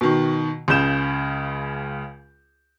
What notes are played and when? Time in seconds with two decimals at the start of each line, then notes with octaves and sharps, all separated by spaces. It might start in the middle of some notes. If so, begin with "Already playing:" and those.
0.01 B2 D#3
0.68 C#2 C#3 G6 E7